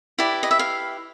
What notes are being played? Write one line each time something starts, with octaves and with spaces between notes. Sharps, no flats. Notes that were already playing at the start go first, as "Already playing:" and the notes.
E4 G4 B4 D5
D#5
E5
F5